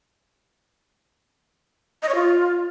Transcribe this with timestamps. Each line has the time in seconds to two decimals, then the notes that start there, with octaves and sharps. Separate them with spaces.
2.03 D#5
2.09 C#5
2.15 F4